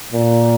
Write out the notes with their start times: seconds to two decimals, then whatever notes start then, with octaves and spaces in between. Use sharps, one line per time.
0.12 A#2